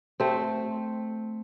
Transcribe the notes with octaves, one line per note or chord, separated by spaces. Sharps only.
A3 C4